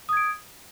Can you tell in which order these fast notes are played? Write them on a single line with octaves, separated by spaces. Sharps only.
D#6 G#6 D7